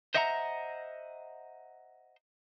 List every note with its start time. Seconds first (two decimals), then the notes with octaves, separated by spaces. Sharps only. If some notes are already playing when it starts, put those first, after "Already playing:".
0.14 C5 D#5 E5 F#5 A5 A#5